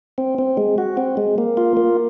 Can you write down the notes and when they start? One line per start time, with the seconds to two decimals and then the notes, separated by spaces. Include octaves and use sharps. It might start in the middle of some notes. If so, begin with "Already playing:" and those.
0.18 C4
0.39 C4
0.57 G#3
0.78 F#4
0.97 C4
1.17 G#3
1.38 A#3
1.57 F4
1.77 A#3